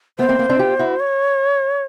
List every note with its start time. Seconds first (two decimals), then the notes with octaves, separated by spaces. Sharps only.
0.19 A3 B3 C5
0.29 A#3 C4
0.39 A#3 C4
0.49 C4 D4
0.59 F4 G4
0.79 E4 F#4
1.00 C#5